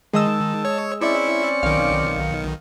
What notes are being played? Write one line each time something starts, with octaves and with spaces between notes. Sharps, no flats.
D#3 G#3 D#5 A5 E6
C#5
C4 C#4 E4 D5 E5 C#7
B1 D#3 F5